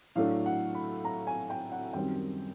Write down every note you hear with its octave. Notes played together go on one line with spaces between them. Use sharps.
A2 F#3 A3 D4 F5
F#5
B5
A#5
G#5
G5
F#5
F#2 D#3 G3 C4 G5